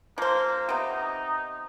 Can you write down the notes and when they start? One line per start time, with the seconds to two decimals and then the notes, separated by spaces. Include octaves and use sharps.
0.18 F3 A#3 C5
0.69 C3 B3 D#4